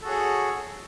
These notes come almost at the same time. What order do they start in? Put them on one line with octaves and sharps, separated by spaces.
A4 F#4 G#4 C#5 F#5